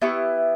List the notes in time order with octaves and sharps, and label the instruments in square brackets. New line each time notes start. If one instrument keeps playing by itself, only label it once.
[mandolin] B3 E4 G4 C#6